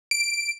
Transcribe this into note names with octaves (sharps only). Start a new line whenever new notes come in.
D7